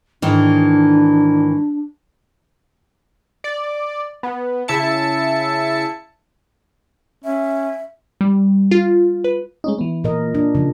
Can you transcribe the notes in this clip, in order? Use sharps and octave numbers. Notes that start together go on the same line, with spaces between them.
G#2 D#3 E3 D4
D5
B3
C#3 E4 E5 A5 C#7
C#4 E5
G3
F4
B4
G#3 C#4 D#4
E3 B3
A#2 A#4 D#5
D4
C#3 F3